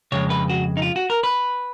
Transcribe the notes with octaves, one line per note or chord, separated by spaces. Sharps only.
F2 C#3 G#3 C#5
B4
F#4
D#4
F4
F#4
A#4
B4